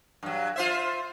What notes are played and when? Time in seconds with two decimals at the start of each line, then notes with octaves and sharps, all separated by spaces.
0.23 G2 F#3
0.56 F4 C5 E5